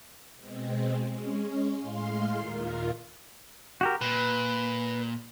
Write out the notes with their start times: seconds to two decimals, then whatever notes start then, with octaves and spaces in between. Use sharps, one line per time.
0.36 B2 G#3 C4
1.09 G#3 C#4
1.77 A2 G#3 F5 C6
2.38 D#2 A#2 F4 A#4
3.81 F#4 G4 A#4
4.01 A#2 B4